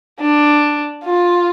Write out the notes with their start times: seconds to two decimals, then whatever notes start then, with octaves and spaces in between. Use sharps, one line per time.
0.20 D4
1.05 F4